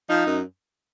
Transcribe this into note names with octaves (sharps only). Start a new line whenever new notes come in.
F3 D#4
F#2